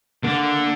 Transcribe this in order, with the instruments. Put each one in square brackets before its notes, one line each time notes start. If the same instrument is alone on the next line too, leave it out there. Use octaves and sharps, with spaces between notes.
[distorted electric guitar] D3 [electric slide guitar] A#3